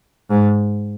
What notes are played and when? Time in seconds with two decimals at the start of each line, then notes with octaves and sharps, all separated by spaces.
0.30 G#2